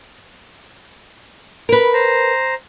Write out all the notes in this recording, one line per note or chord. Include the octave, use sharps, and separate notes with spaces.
A#4 B4
C5 A#5